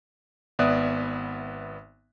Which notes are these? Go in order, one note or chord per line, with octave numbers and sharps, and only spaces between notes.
G#1 B3 D5 E5 D#6 F#6